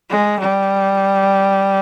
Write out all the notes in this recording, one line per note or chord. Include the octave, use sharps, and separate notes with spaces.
G#3
G3